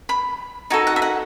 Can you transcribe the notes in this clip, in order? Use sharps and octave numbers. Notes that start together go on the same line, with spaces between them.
B5
D#4 F#4 A4 G#5
F#5
E5
F#5